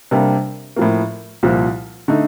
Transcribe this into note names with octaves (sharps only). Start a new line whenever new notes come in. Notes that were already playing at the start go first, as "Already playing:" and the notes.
C3 G3 A#3 D4
A2 F3 A#3
C2 A#2 F3
D3 A3 D#4